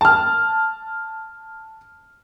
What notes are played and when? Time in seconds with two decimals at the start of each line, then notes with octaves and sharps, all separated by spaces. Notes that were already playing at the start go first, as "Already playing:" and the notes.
0.01 A5 F6